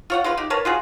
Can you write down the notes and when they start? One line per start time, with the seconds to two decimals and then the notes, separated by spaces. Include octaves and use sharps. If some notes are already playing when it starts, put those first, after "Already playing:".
0.10 F4 C#5 F#5
0.24 G#3 F4 B4
0.37 D#4 G4
0.50 A#4 B4 C#5 A5
0.65 F4 F#4 G#4